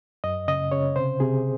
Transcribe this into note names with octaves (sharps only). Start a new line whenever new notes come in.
F#2 D#5
C#3 D#5
C#3 C#5
C3 C5
C3 G#4